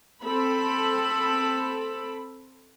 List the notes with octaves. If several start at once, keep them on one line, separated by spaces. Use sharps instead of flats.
C4 A4 B5